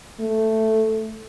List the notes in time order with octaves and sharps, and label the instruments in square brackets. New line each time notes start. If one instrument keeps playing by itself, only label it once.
[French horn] A3